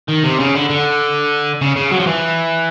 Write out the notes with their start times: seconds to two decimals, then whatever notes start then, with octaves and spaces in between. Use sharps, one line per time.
0.08 D#3
0.24 C3
0.39 C#3
0.55 D3
0.69 D3
1.61 C#3
1.76 C#3
1.91 F#3
2.00 F3
2.07 E3